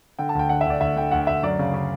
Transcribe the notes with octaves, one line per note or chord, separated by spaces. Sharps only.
D3 G5
A5
D2 G5
D3 F#5
E5
D2 D5
D2 E5
D3 G5
D2 F#5
D2 E5
F#2 D5
C#3
C#3